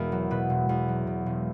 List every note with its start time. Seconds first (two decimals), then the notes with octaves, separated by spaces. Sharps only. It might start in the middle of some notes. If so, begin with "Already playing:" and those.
Already playing: E1 E2 B2 A#4
0.12 F#3
0.31 B2 B4
0.50 E1
0.69 E2
0.88 F#3
1.07 B2
1.26 E1